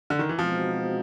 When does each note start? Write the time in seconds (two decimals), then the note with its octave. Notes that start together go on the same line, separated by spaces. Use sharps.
0.10 D3
0.19 D#3
0.29 E3
0.38 B2 F3 G#3 C4 D#4 F#4